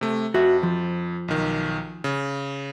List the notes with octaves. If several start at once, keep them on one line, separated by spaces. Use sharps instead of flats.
C3 A3
F2 F#4 E5
F3
B1 D#3
C#3